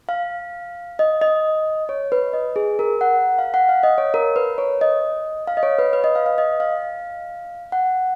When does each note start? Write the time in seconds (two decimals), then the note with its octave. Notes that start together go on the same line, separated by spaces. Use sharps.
0.09 F5
0.99 D#5
1.22 D#5
1.89 C#5
2.12 B4
2.33 D#5
2.56 G#4
2.79 A#4
3.01 F#5
3.38 F5
3.54 F#5
3.69 F5
3.83 D#5
3.98 C#5
4.14 A#4
4.36 B4
4.58 C#5
4.81 D#5
5.47 F5
5.57 D#5
5.63 C#5
5.79 B4
5.93 B4
6.04 D#5
6.16 F5
6.26 F5
6.38 D#5
6.60 F5
7.72 F#5